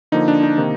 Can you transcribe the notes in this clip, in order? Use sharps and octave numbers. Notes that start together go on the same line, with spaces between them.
D3 F3 A#3 D#4
D4
D#4
C3 D#3 A#3